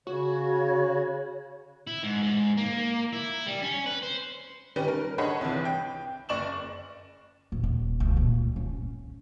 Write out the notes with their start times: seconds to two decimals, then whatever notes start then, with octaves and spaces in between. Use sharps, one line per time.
0.07 C#3 F#4 C#5
1.87 E4
2.03 G#2
2.22 G#2
2.57 A#3
3.13 E4
3.47 G3
3.62 C#4
3.86 B4
4.02 C5
4.76 D#3 G3 C#4 B4
4.88 A#4
5.18 D4 G#4 C#5 D#5 F#5 B5
5.41 C2 E3
5.65 G5
6.29 F#1 D5 C#6 E7 F#7
7.52 D#1
7.63 D#1
8.00 C#2
8.17 A#2
8.56 C#4